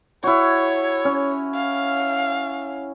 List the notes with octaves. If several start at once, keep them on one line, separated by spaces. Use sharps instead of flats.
E4 F#4 C#5
C#4
F5